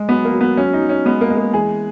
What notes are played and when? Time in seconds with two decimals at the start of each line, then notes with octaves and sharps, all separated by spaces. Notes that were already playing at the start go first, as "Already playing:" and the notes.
Already playing: G#3
0.09 F#3 B3
0.25 A#3
0.33 F#3
0.41 B3
0.57 F#3 C#4
0.73 D#4
0.81 F#3
0.89 C#4
1.05 G#3 B3
1.21 A#3
1.30 G#3
1.37 A#3
1.53 E3 G#4